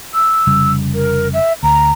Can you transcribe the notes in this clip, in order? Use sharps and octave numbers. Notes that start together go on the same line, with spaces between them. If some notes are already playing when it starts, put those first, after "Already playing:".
E6
F1 C#3 G3
A#4
E5
D2 A#5